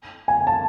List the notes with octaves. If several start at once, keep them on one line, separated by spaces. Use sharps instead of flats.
G#5
A5